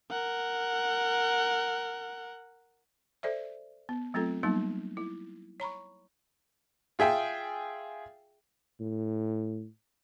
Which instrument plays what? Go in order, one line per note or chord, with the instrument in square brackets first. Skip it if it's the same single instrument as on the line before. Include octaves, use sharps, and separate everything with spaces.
[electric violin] A#4 F#5
[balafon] A4 C5 D5 E5
B3
F#3 A3 C4 F4 A4
F#3 G3 A#3 B3 D#4
E4
C#5 A#5 B5 C#6
[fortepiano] F4 G#4 E5 G5 G#5
[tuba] A2